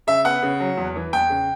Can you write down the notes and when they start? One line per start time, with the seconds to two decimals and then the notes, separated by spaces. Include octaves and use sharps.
0.07 C#3 E5
0.25 B3 F#5
0.43 C#3
0.60 F#3
0.77 E2
0.96 E3
1.13 E2 G5
1.30 C#3